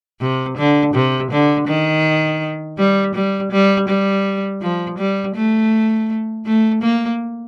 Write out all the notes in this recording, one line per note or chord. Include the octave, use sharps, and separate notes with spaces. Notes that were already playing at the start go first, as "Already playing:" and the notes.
C3
D3
C3
D3
D#3
G3
G3
G3
G3
F3
G3
A3
A3
A#3